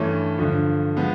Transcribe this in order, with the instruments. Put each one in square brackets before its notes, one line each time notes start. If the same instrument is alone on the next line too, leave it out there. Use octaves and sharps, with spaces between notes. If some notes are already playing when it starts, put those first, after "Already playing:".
Already playing: [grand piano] G2 E3 A3 C#4
G2 D3 F3
F3 G#3 B3